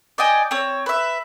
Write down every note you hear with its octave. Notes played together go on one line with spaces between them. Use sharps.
D5 D#5 G5 G#5
C4 C#5
B4 E5